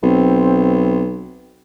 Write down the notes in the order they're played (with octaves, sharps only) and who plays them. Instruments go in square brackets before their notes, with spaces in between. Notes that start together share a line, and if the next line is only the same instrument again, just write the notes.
[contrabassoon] B1 [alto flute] C4